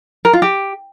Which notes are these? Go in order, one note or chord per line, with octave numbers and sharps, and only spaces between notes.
A#4
F4
G4